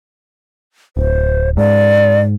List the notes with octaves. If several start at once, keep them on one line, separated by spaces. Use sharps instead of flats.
D1 C5
G#2 D5